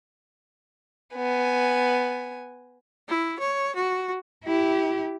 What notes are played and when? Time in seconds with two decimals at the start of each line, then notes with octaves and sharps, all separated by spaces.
1.15 B3 G#5
3.08 E4
3.39 C#5
3.75 F#4
4.44 E4 G4